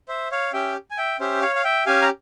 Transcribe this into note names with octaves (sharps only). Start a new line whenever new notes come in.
C5 E5
C#5 F5
C#4 G4 E5 G5
G#5
E5 G5
C#4 G4 C5 E5
C#5 F5
F5
E5 G5
C#4 G4 F5 G#5
A#5